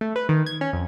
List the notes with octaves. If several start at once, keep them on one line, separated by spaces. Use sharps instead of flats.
A3
B4
D#3
G#6
C#4
F2